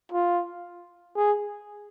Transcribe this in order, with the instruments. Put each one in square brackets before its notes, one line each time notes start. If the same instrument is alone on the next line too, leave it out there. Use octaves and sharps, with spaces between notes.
[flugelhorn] F4
G#4